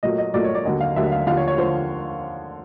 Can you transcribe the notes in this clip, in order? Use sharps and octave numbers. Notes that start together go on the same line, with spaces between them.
A#2 F#3 A3 D#5
D#5
A#2 F#3 A3 D5
C#5
D5
D#2 D3 F#3 D#5
F5
D#2 D3 F#3 E5
F5
D#2 D3 F3 F5
C#5
C#5
D3 F3 C5